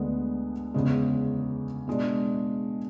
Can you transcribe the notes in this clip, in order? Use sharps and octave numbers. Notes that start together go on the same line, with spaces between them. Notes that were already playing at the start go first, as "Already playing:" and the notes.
Already playing: D2 D3 G#3 B3
E2 C#3 G#3
B2 G#3 D4